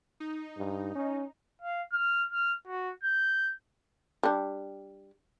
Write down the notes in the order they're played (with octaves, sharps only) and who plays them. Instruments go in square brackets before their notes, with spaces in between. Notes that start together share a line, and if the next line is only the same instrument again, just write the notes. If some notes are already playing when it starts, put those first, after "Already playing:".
[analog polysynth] D#4
[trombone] G2
C#4
[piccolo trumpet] F5
F6
F6
F#4
G6
[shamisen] G3 D4